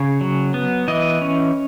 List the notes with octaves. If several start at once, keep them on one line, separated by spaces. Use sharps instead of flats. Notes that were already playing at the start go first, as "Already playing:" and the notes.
Already playing: C#3 C#5
F#3
B3
E3 D#5
C#4